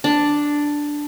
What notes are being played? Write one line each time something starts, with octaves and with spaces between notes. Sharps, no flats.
D4